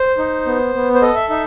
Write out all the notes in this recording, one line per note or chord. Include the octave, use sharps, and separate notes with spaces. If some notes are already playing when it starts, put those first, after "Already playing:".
Already playing: C5
D#4
B3
B3
C5
A4 D#5
E5
D#4 E5